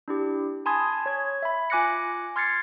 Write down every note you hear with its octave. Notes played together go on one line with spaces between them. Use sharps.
D4 E4 G4
G#5 A5 B5 C6 D#6 G#6
C#5 G#6
E5 B5
F4 G#5 D6 F#6 A#6 C#7
C6 F6 G#6 A6 C7 C#7